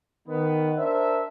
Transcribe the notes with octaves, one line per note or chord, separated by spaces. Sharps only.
D#3 B3
D4 A#4 C5 E5